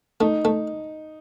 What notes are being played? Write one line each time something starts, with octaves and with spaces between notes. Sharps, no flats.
A3 D#4
A3